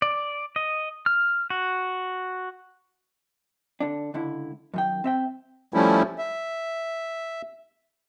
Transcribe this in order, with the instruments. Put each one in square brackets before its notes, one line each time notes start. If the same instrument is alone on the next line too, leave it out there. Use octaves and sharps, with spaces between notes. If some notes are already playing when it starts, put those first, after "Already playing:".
[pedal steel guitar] D5
D#5
F6
F#4
[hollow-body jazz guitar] D3 D4
C#2 D3 E4
F#2 D#3 G5
C4 E5 G5
[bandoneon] F3 G3 A3 C#4 E4
E5